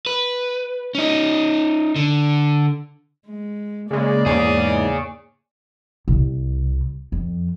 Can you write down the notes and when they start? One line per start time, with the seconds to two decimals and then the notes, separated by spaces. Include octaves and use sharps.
0.06 B4
0.95 C#4 D#4
1.96 D3
3.27 G#3
3.91 C#3 G#3 A#3 D5
4.26 E2 G#2 G#4 C#5
6.08 C2
7.12 F2